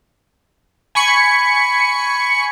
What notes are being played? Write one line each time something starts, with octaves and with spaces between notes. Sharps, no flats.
G#5 B5 C#6 C#7